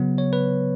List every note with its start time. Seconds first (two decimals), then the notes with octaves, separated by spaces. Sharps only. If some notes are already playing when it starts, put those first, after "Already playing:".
Already playing: C#3 F#3 B3
0.18 C#5
0.33 B4